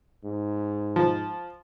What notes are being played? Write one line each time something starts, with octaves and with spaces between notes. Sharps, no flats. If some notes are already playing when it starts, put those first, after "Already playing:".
G#2
F3